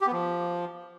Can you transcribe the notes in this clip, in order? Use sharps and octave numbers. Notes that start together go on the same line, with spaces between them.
G4
B3
F3